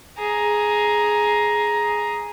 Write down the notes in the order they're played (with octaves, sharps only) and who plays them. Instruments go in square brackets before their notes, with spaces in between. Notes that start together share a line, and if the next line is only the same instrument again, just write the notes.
[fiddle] G#4 A#5